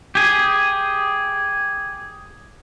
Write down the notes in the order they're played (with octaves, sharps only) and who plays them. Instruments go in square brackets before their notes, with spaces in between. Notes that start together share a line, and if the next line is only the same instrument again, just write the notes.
[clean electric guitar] G4 G#4